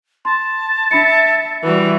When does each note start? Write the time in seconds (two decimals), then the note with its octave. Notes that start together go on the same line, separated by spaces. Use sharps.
0.25 A5 C6
0.91 D4 E5 B5 C#7
1.63 E3 G3 F#4